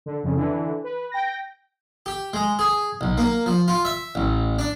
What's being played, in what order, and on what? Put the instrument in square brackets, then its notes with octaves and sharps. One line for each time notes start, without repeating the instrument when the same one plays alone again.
[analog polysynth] D3
F2 C#3
D3 E3
B4
G5 A#6
[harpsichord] G4
G#3
G#4
B1
A#3
F3
F4
E5
A1
D4